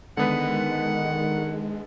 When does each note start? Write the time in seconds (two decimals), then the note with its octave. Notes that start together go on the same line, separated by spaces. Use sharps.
0.17 D3 D#3 G#3 B3 B4 F#5